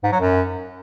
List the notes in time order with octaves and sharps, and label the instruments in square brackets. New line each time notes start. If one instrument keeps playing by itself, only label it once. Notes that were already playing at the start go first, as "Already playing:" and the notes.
[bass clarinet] G#2
F#3
F#2